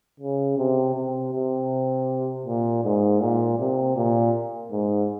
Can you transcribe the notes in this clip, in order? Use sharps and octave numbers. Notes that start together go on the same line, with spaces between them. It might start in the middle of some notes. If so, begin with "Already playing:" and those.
C#3
C3
C3
C3
A#2
G#2
A#2
C3
A#2
G#2